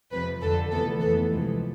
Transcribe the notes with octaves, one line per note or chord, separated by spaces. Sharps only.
F2 C3 F3 B4
F2 D3 F3 A4
D2 C3 E3 B3 A4
F2 E3 B3 A4
D2 C3 F3 G#3